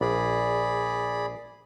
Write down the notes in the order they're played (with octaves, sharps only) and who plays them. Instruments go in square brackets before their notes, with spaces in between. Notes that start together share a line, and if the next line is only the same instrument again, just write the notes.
[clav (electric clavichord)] A#1 [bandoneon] G#4 D5 B5